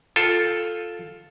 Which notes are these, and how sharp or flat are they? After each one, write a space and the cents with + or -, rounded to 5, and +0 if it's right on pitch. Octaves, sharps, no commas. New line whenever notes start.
F4 +5 A4 +0 G5 +25